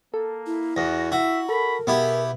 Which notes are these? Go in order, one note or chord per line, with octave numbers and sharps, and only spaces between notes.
A#3 A4
E4
E2 F#4 A#6
E4 F#4 E5
A4 A#4 B5
B2 B3 E4 G4 G#4